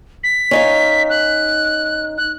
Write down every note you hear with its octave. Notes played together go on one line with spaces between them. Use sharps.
B6
C#4 D#4 F5
F#6
F#6